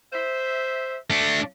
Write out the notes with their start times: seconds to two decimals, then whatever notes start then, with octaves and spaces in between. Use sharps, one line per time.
0.12 C5 E5
1.10 A3 D4